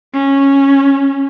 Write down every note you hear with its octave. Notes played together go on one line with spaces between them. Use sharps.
C#4